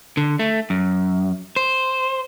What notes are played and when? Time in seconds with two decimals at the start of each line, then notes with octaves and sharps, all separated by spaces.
0.17 D3
0.39 A3
0.70 F#2
1.56 C5